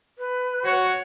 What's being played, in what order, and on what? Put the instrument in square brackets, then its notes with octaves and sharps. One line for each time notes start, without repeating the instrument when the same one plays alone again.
[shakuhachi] B4
[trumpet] F#4 [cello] C#5